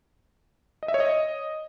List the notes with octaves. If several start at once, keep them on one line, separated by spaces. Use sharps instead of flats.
D#5
E5
C#5
D#5